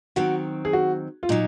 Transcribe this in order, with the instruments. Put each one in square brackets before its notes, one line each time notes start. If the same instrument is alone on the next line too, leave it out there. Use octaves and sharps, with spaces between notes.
[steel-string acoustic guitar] D#3 F#3 C4 [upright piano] F#4
[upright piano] G#4
F#4
F4
[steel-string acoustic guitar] A#2 F#3 [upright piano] D#4